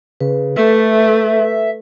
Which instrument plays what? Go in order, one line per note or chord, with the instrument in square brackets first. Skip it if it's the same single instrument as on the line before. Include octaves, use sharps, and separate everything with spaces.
[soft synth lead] C#3 [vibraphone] B4
[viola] A3 [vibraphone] A4 B4 [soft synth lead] E5